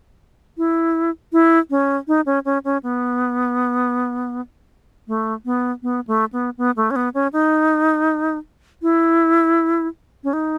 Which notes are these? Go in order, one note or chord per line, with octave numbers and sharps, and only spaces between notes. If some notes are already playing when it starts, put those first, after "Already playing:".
E4
E4
C#4
D#4
C#4
C#4
C#4
B3
A3
B3
B3
A3
B3
B3
A3
C#4
B3
C#4
D#4
E4
C#4
D#4